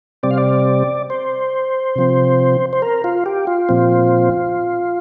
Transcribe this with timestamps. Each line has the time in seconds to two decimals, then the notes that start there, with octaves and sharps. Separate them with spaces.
0.23 C3 G3 C4 D5
0.31 F5
0.38 D5
1.10 C5
1.96 C3 F3 C4
2.73 C5
2.82 A#4
3.04 F4
3.26 G4
3.47 F4
3.69 A#2 F3 C4